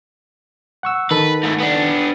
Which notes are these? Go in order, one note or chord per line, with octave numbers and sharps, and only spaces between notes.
F#5 C#6 E6
D#3 A4 B4 B5
G#2 A3
B3 D4